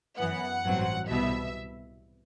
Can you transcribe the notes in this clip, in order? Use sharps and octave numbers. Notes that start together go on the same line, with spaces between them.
F#2 E3 B3 F#5
A1 G2 F#3 C4
C2 B2 G3 B3 E5